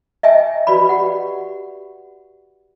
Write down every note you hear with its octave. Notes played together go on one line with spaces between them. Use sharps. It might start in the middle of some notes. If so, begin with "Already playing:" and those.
D#5 E5 G5 G#5
F#4 B4 D5 B5
G4 D5 F#5